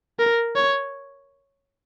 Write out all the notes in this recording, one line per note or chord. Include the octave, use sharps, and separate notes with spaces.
A#4
C#5